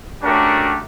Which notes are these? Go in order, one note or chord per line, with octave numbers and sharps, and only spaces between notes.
A3 C#4 D4 F#4 G4 A#4